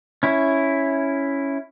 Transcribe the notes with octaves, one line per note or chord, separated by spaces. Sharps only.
C#4 E4